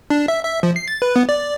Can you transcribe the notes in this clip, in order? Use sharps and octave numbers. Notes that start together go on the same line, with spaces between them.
D4
E5
E5
F3
C7
A6
B4
B3
D5